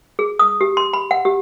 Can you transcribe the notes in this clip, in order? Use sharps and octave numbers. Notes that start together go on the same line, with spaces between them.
G#4
D#6
G4
C6
B5
F#5
G4